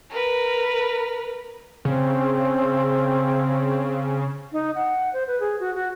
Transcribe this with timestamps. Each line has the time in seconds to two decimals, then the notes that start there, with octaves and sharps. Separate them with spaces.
0.10 A#4 B4
1.85 C#3 C4
4.53 D#4
4.75 F#5
5.13 C5
5.27 B4
5.40 G#4
5.60 F#4
5.75 F#4